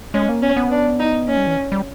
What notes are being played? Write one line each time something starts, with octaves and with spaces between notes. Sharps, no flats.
G#3 C#4
A#3
B3 C#4
B3
D4
D#4
A#3 C#4
G3
E3
G3